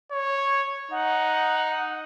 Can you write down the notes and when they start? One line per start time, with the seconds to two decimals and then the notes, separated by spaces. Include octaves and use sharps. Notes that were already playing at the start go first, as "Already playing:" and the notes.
0.12 C#5
0.91 D#4 F#5